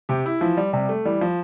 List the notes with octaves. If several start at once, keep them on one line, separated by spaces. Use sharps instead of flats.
C3 G4
E4
E3 F3
G3
C3 G3
A3
E3 G3
F3